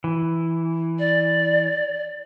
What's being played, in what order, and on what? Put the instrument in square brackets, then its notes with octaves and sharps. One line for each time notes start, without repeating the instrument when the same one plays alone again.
[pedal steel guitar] E3
[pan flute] D5